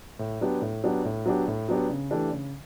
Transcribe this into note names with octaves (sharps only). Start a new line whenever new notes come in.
A2
F#3 B3 D4 G4
A2
F#3 B3 D4 G4
A2
F#3 B3 D4 G4
A2
F#3 B3 D4 G4
C#3
E3 A3 D4 G4
C#3